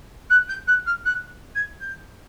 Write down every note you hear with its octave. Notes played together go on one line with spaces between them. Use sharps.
F#6
G6
F#6
F6
F#6
G#6
G6